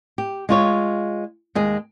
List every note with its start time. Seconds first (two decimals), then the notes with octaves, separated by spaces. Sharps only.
0.18 G4
0.49 G#3 F4 C#5
1.55 D#2 G#3 G#4